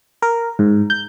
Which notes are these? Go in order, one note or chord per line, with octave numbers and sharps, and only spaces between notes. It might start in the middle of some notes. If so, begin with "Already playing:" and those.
A#4
G#2
G6